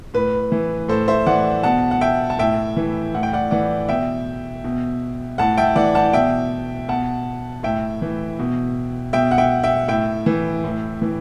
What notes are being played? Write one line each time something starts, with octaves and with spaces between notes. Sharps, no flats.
A2 B4
E3
A2 A4 C5
C5 E5
E3 D5 F#5
B2 F#5 A5
F#5
E5 G5
A5
A2 E5 G5
E3
A2 F#5
G5
D5 F#5
E3 D5 F#5
B2 E5 G5
B2
A2 F#5 A5
E5 G5
E3 D5 F#5
F#5 A5
B2 E5 G5
B2 F#5 A5
A2 E5 G5
E3
B2
B2 E5 G5
F#5
E5 G5
E5 G5
A2 E5 G5
E3
A2
E3